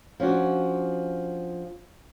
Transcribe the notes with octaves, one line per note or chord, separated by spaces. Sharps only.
F3 C#4 D4 F#4